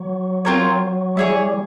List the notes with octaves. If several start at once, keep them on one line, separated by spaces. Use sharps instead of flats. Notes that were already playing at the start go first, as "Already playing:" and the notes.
Already playing: F#3
C4 F4 A#4 C#5
G3 E4 G#4 C#5